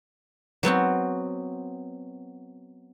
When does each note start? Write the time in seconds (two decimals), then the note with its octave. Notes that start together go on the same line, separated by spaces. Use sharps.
0.63 F#3 B3 C4 F#4